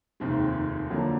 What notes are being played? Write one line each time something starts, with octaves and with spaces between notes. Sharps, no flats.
F1 D#2 D#3 G#3 C4
F2 D3 F#3 A#3